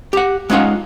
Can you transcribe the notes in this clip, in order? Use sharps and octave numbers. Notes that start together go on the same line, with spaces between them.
G4 F#5
G#3 C#4 D#4 F4 F#5